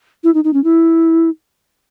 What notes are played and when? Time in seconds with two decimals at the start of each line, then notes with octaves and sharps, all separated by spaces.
0.24 E4
0.34 D#4
0.44 D#4
0.53 C#4
0.64 E4